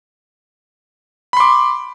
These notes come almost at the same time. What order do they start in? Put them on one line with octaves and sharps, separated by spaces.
B5 C6 D6